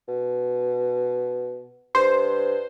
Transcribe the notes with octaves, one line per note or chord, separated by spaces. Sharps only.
B2
G2 C5